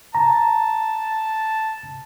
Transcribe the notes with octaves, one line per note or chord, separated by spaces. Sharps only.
A5 A#5